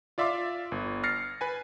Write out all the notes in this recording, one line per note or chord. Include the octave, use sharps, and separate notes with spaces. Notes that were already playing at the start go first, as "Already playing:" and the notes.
F4 D5 E5 F5 C6 D6
G1
F6 A6 A#6 C7 C#7
B4 G#5